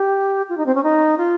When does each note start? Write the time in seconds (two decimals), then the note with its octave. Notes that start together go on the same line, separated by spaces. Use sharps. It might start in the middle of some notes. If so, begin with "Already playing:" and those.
Already playing: G4
0.49 F4
0.57 D#4
0.66 C4
0.75 C#4
0.83 D#4
1.18 F4